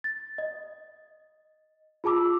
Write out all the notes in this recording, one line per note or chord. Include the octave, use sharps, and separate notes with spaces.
A6
D#5
F4 G#4 A5 D6 E6